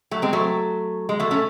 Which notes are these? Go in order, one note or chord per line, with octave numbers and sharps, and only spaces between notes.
F#3 A3
G#3 C4
F#3 A3
G#3
F#3 A3
A3 C#4